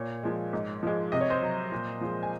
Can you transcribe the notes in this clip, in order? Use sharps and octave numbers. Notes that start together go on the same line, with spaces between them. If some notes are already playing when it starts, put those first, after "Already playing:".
Already playing: A#2 C#5
F3 G#3
G#2
F3 G#3
C3 D#5
C#5
C5 D#5
F#3
A#2
F3 G#3
G#5